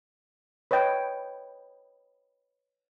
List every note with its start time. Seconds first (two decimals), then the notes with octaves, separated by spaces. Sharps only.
0.71 B4 C#5 D#5 G5